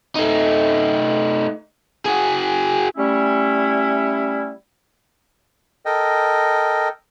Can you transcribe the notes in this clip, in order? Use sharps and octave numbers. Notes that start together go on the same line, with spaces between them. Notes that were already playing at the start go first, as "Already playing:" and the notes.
A3 D#4
F#4 G#4
G3 A3 C#4 E4
A4 A#4 D#5 G5